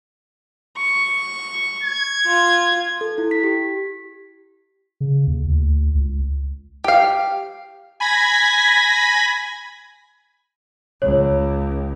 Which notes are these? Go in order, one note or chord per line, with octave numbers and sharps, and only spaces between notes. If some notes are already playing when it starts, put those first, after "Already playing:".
C#6
G#6
F4
A4
E4
B6
G4
C#3
D#2
D2
C#2
G4 F5
G#5 B5 G#6 A#6 B6
C#2 C#5